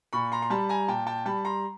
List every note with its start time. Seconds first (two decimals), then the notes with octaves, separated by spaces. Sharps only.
0.13 A#2 B5 C#6
0.32 A#5 C6
0.42 C6
0.50 G3 A5 B5
0.69 G#5 A#5
0.88 A#2 G5 A5
1.07 G5 A5
1.25 G3 A5 B5
1.45 A#5 C6